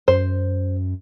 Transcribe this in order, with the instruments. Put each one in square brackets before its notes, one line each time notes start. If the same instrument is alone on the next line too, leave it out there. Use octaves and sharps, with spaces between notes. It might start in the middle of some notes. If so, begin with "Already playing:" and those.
[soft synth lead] F#2 [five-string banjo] C5